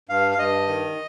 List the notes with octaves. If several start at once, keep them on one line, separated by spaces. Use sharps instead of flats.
G2 F5
F5
G2 D#5
D#3